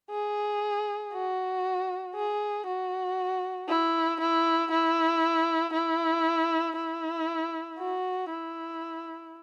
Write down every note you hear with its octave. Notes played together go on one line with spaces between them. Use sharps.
G#4
F#4
G#4
F#4
E4
E4
E4
E4
E4
F#4
E4